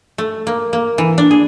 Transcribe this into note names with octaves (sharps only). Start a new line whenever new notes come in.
A3
A#3
A#3
E3
D4
G#4